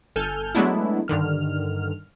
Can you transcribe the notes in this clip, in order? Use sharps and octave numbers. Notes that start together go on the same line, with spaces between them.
G1 A4 G#5 F6 G6
F#3 G#3 A3 B3 D4 E4
G2 D3 D#3 F6